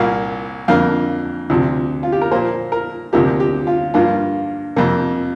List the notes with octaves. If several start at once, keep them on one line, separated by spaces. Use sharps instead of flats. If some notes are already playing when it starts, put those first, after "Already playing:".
Already playing: C2 A#2 A#3 F5
F2 D3 A#3 F5
D2 C3 F3
F4
G4
A#4
A#2 F3 A#3 C5
A#4
D2 C3 F3 A#3 G4
G4
F4
G2 F3 A#3 F4
F2 C3 A#3